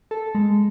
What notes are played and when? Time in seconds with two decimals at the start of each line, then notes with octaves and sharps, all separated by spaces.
0.11 A4
0.35 G#3